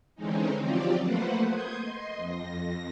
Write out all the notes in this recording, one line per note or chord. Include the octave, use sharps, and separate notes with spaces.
D3 E3 G#3 C4 C#4 D#4
F3 F#3 C4 F4 G4 D5
A3 A#3 B4 C5 F#5
C6 D#6 G6 G#6
D#5 C6
F2 A#6